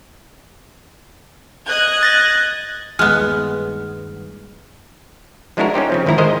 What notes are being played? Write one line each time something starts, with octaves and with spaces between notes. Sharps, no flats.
D#5 F#6 G#6
A6 A#6
D#1 G2 G#3 B3 F6
F3 G#3 D4 E4 F#4 A#4
C#4 D#4 G4 C5
C#3 F3 C4
G#1 D#3 F3 E4 A#4 A#5
D#3 G#3 A#4 C5 D#5